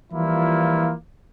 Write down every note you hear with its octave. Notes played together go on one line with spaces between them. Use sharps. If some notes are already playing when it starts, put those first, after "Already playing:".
E3 F3 G3 A#3 E4 F4